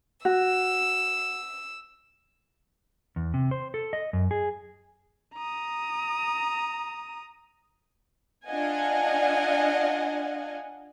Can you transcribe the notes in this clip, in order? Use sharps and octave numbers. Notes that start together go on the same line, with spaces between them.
F#4 E6
E2
C3
C5
A4
D#5
F#2
G#4
A#5 D#6
D4 F4 D#5 F5 F#5 G#5